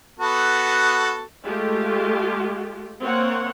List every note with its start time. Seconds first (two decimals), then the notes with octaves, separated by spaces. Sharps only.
0.20 B3 F#4 A4
1.43 G#3 A3 F4 G4
3.02 A#3 C4 C#5 F#5